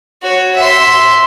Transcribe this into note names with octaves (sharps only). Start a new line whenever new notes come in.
F#4 C#5
E5 C6